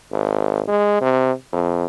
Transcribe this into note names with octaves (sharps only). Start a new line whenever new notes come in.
G#1
G#3
C3
F2